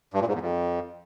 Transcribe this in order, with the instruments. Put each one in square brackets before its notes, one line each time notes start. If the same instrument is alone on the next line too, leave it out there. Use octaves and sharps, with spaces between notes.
[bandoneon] G2
A#2
G#2
E2
F2